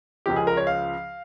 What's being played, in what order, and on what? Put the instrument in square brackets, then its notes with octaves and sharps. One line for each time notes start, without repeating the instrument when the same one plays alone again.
[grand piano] C#2 C#3 F3 G4
G#4
A#4
C#5
F5